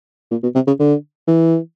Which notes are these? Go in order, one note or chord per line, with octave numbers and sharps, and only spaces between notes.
A#2
B2
C3
C#3
D3
E3